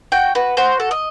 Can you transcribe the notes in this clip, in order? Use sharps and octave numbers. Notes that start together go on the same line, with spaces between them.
F#4 G5
F#4 B4
F#4 C5
A4
D#5